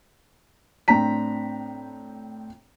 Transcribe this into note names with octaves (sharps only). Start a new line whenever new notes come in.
A2 C4 D4 G5 A#5 B6